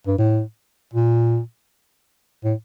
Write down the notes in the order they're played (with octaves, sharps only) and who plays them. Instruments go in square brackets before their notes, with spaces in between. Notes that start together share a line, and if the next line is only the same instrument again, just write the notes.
[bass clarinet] G2
A2
A#2
A2